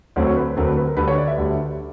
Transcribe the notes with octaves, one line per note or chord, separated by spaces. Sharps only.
D2 D3 F#3 A3 C4 C#5
C#5
B4
D2 D3 F#3 A3 C4 A#4
B4
B4
A#4
D2 D3 G3 B4
C#5
D5
E5
D2 D3 G3